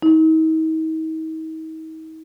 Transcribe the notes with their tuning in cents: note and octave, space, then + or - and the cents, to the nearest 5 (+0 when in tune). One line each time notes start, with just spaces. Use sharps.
D#4 +40